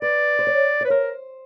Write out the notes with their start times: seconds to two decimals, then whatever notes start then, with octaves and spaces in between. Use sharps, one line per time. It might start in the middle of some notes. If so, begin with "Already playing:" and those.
0.02 B4 D5
0.39 C5
0.47 C#5
0.81 C#5
0.85 B4
0.90 A#4 C5